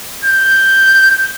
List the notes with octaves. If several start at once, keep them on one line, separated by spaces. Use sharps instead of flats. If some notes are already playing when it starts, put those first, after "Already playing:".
G6